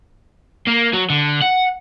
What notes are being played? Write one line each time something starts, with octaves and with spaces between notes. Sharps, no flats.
A#3
F#3
D3
F#5